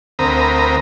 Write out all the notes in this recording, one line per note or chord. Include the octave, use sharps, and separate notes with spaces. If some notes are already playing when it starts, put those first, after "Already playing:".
D2 C4 A#4 A#5 B5 D#6